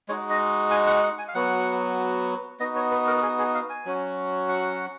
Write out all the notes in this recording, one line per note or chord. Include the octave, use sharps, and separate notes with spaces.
G#3 D#4 F#4 C#5
D#5
G#5
F#5
F#5
G#5
F5
F#3 B3 F#4 F#5
B3 D#4 F#4 D#5
C#5
B4
A#4
G#4
G#4
F5
G#5
F#3 C#4 F#4
F#5